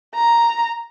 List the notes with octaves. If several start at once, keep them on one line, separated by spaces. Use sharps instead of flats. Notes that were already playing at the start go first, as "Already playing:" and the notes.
A#5